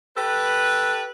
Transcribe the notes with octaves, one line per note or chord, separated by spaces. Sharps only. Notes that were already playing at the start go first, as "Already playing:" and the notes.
G4 A4 B4